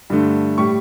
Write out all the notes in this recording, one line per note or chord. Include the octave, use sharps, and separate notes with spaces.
G2 D3 A3
A2 G3 C#6